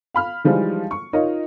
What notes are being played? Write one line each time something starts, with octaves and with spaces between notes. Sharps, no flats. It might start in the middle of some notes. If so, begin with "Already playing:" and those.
F5 B5 F6
E3 F3 G3 G#3 D#4
C#6
D#4 F4 A#4 C#5 D#5 F5